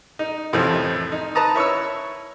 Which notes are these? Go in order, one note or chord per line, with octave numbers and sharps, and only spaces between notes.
D#4
F2 A2 C3 E3 F3
D#4
B4 A5 A#5 D#6
E4 C#5 C#6 E6